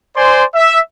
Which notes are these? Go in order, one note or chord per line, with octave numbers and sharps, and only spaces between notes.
C5 D5 G#5 C6
E5